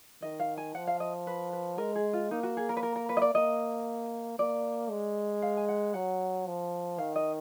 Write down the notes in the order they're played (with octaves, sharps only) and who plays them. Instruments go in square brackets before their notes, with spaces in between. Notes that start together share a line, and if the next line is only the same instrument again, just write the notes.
[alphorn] D#3 [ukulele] D#5
[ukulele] F5
G#5
[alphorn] F3 [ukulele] F#5
[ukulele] F5
D#5
B4
B4
[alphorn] G#3 [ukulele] A#4
[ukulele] G#4
F4
[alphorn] A#3 [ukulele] D#4
[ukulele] F#4
G#4
A#4
B4
A#4
A#4
B4
D#5
D5
[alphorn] A#3 [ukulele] D#5
[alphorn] A#3 [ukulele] D5
[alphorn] G#3
[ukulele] F5
G#5
F#5
[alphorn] F#3 [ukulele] F#5
[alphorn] F3
[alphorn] D#3 [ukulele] F5
[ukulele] D#5